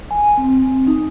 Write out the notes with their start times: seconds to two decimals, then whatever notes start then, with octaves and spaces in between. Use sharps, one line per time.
0.11 G#5
0.37 C4
0.87 D#4